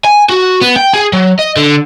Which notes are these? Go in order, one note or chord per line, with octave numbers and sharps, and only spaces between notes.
G#5
F#4
B3
G5
G#4
F#3
D#5
D3